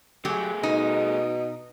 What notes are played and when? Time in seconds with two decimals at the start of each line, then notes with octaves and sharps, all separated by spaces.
0.25 F#3 A3 G4 G#4
0.63 B2 D#4